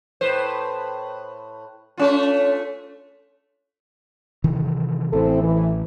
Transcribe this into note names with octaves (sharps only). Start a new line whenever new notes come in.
A2 B4 C5
A3 C#4 F4
C3 D#3 E3
A1 C4 E4 A4
E3